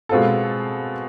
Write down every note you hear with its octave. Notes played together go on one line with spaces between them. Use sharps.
B2 G#3 C4 F4 A4